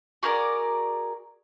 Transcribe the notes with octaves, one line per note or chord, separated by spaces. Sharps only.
F#4 G#4 A#4 D5